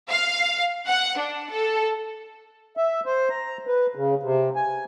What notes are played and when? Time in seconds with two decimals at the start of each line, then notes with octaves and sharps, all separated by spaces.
0.10 F5
0.87 F#5
1.18 D4
1.50 A4
2.77 E5
3.06 C5
3.30 A#5
3.67 B4
3.95 C#3
4.23 C3
4.56 G#5